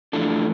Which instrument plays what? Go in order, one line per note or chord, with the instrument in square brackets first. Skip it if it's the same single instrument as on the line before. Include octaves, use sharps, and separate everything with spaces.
[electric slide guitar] F2 E3 A3 D4 F4 A4